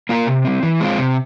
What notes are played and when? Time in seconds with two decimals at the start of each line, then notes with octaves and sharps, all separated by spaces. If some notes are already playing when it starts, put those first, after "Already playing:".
0.09 A#3 F4 A#4
0.27 C3
0.45 G3 C4
0.63 E3
0.80 G#3 C4 F4
0.98 C3